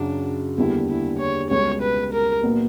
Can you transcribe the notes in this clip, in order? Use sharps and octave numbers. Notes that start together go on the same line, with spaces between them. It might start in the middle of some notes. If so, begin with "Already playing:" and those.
Already playing: F#2 C#3 F#3 D4
E2 D3 G3 A#3 D4 E4
E4
C#5
C#2 B2 G3 C#5
B4
A#4
A#1 A#2 F#3 B3